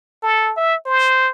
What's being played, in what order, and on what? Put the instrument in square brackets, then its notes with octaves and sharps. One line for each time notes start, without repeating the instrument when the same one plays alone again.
[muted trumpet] A4
E5
C5